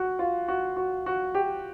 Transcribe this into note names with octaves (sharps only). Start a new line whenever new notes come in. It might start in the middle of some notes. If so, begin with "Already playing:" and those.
Already playing: F#4
F4
F#4
F#4
F#4
G4